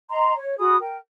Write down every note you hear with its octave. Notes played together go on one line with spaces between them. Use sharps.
D#5 A#5 C6
C#5
F#4 G#4 B5 D#6
A#4 G5